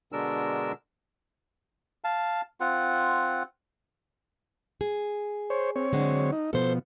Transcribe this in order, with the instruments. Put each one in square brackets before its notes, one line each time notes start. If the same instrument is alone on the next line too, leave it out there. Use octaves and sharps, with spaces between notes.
[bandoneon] B2 D3 G#3 D4 A#4 E6
[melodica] F5 A5
C4 F4 F#5
[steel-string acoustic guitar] G#4
[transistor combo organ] C5 C#5
C4 C#5
[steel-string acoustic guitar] D3 F#3 G#3
[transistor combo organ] D#4
[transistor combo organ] B2 F3 [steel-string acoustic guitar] A4 C5